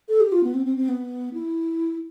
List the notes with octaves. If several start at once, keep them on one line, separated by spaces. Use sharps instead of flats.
A4
G4
F4
B3
C4
C4
C4
B3
E4